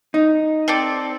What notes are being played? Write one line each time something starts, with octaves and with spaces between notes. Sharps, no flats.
D#4
C4 A4 D5